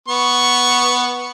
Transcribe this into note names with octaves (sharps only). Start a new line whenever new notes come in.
B3 C#6